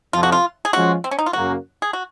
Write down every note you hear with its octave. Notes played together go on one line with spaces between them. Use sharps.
F2 C3 F3 F4
F#4
F4
G#4
F3 G#3 C#4 F4 F#4
C4
C#4
D#4
F4
F#2 C#3 F#3 A#3 F#4
G#4
F#4